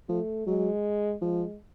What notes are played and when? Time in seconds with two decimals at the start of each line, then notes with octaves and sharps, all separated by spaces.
0.09 F3 A3
0.46 F#3 G#3
1.21 F3 G#3